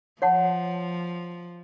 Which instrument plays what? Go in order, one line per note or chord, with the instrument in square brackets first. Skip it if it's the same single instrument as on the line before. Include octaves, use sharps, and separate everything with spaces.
[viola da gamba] F3 [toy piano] C#5 F#5 A5